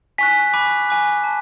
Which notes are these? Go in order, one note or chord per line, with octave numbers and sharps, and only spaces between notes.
G#5 C#6 F#6 B6
G#5 B5 D6 F#6
G#5 D6 F#6
A5